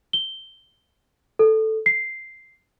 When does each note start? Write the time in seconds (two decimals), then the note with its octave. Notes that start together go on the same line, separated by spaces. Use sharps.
0.13 G7
1.39 A4
1.86 C7